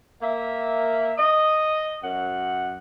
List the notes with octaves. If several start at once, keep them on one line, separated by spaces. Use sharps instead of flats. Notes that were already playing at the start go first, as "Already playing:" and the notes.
A#3 E5
D#5
F#2 F#5